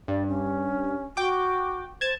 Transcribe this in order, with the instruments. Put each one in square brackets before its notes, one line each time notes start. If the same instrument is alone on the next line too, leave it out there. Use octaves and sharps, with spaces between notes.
[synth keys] G2 [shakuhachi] D5
[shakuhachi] C#4
[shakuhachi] F#4 [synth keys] G5 D6
[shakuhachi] C5 [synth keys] A5 G#6